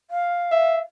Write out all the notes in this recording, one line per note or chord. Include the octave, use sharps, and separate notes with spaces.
F5
E5